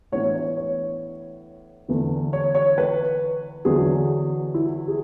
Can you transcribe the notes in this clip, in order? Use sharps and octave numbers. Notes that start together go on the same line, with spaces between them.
A2 E3 B3 D4 C#5
C#5
C#5
E2 D3 A3
C#5
C#5
B4
E2 D3 F#3 G#4
E4
G#4